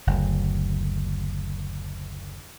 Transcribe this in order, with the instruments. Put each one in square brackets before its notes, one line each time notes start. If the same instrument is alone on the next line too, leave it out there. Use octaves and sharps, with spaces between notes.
[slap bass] F#1 D2